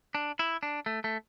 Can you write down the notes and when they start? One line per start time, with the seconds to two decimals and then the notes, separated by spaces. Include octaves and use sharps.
0.15 D4
0.39 E4
0.63 D4
0.86 A3
1.04 A3